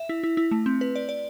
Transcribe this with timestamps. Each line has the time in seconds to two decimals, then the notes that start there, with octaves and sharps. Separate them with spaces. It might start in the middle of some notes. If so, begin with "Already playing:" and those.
Already playing: E5
0.09 E4
0.23 E4
0.37 E4
0.51 A3
0.66 C4
0.81 B4
0.96 D5
1.09 D5